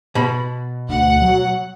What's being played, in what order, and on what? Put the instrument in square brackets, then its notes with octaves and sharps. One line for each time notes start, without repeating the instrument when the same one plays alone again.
[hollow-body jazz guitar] B2 B5
[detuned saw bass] D2 [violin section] F#5
[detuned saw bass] F#3